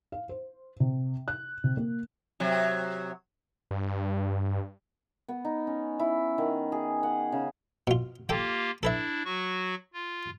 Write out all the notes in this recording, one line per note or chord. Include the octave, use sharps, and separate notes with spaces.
F5
C5
C3
F#6
C3
A#3
C3 F#3
G2
B3
D#4
C#4
E4
D#3
G#4
F#5
C#3
B2 F4
A#3 F4 G4 A4 G5
D4 E4 A4 B4 E5
F#3 F#4 C#6
F4